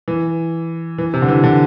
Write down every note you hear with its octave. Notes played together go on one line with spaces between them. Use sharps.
E3
E3
C3
D3
E3
D3